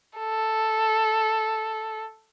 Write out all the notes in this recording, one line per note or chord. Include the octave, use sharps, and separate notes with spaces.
A4